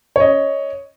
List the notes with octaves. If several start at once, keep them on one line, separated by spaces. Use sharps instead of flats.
C#5 D#5